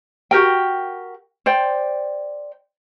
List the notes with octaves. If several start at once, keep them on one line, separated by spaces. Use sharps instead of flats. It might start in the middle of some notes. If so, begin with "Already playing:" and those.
F#4 G4 A#4 G5
C5 D5 G5